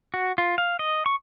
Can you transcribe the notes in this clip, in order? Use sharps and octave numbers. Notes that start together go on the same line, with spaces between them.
F#4
F4
F5
D#5
C#6